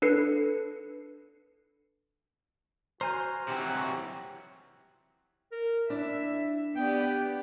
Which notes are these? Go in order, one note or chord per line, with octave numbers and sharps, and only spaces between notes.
D4 A4 B4 C7 C#7
F#4 C5 G#5 A#5 F6 G6
C3 E3 F#3 F#4 G4
A#4
D4 E4 E5
B3 G4 D5 G5